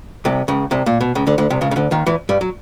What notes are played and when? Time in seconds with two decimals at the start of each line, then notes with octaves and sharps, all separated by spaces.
0.25 C2 C3
0.48 C#2 C#3
0.71 C2 C3
0.86 A#2
1.01 B2
1.15 C#2 C#3
1.27 D2 D3
1.38 D2 D3
1.50 C2 C3
1.61 C#2 C#3
1.71 C#3
1.76 D2 D3
1.91 D#2 D#3
2.06 E2 E3
2.29 G2 G3
2.41 F#3